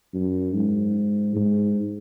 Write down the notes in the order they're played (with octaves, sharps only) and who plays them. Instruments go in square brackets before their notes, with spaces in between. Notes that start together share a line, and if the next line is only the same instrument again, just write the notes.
[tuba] F#2
G#2
G#2